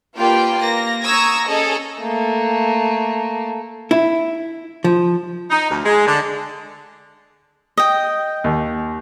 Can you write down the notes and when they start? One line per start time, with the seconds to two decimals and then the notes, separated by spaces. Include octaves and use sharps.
0.17 A#3 F4 G4 B4 D5 G5
0.58 A#3 A#6
1.02 A#5 C#6 D#6 E6 G#6 A#6
1.48 C#4 G#4 A4 D#5 A#5
1.99 A3 A#3
3.91 E4
4.84 F3
5.50 D#4
5.71 D2
5.84 G#3
6.06 D3
7.77 D#5 G5
8.44 D#2